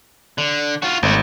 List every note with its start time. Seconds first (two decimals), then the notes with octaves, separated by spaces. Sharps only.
0.38 D3
0.82 F4 F#4
1.03 G#1 D#2 A3